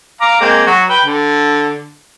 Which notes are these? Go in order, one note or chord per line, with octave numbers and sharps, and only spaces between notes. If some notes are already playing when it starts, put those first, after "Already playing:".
F5 A#5 D6
G#3 A#3 C4
F#3 F#4
B4 G5
D3